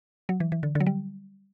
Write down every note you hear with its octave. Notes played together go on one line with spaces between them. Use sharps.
F#3
E3
E3
D3
D3
F#3
G3